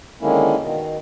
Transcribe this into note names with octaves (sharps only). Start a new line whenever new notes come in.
D3 D#3 G#3 A#3 C#4 E4
B2 D#3